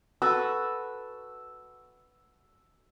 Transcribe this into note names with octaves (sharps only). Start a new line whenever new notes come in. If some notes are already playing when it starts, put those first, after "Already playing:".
F#4 A4 B4 E6